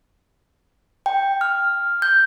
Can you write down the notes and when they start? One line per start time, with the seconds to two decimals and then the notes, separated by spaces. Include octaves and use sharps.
1.06 G5
1.41 F6
2.02 G6